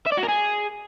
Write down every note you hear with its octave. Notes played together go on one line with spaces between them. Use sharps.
E5
D5
F#4
A#4
G#4